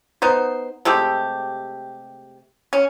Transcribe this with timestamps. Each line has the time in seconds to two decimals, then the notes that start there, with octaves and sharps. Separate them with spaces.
0.22 B3 D#4 C5
0.85 C3 G#3 A3 G4
2.73 C#4